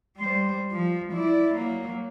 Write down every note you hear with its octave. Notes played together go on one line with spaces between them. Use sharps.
G3 C5
F3
E4 D5
F#3 A#3